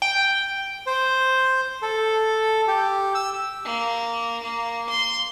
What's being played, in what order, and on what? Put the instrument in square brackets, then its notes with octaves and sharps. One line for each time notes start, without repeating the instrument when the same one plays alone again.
[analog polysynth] G5
[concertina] C5
A4
G4
E6
[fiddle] A#3
A#3
C6